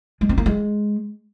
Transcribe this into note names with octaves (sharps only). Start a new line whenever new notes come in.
G#3
C4
A#3
G#3